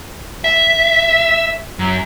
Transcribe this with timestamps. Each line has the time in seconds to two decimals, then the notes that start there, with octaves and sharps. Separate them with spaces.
0.44 E5
1.79 F#2